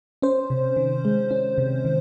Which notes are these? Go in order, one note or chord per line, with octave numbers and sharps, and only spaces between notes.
C#4 C5
C3
D#3
G#3
C#4
C3
D#3